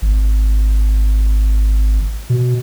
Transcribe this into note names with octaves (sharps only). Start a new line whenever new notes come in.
G#1
B2